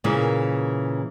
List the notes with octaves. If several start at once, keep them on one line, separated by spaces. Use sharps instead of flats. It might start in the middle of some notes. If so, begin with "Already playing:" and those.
A#2 C#3 E3 A#3